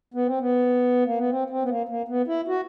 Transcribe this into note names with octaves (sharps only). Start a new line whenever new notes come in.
B3
C4
B3
A#3
B3
C4
C4
B3
A#3
A#3
B3
E4
F#4